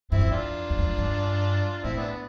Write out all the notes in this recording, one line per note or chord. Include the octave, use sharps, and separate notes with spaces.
G2 C4 E4
F2
D4 F4
E2
F2
G2
A2 C4 E4
B3 D4
B3